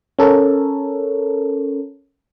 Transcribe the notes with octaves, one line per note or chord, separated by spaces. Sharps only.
C#4 A4 A#4 C#5